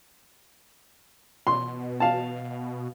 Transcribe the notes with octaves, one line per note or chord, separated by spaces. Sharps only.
B2 C6
F5 A5